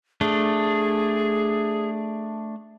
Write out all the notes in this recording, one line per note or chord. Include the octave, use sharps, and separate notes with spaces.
A3 D4 G#4